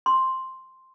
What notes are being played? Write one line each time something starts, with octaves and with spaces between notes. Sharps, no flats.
C6